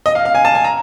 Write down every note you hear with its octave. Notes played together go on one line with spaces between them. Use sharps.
D#5
F5
F5
G#5
A5
G#5
A#5